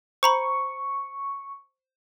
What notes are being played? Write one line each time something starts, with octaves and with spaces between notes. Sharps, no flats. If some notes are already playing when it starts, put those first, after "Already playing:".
C5 A#5 B5 C#6